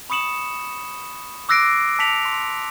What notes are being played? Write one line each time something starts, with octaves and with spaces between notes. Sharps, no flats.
B5 C#6 D#6 C#7 E7 F#7
D6 E6 F#6 A#6 C7 D7
A5 B6 C#7 F7 F#7
C6